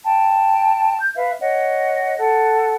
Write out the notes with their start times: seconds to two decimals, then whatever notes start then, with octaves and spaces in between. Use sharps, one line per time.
0.05 G5 A5
0.97 G6
1.16 B4 E5 F5
1.40 C#5 D#5 F#5
2.17 A4 F#5